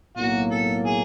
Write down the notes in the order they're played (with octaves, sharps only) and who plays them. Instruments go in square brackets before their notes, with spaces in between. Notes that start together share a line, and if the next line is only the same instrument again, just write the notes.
[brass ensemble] B1 A2 F#3 A#3 [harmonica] F#4
[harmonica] A4
G#4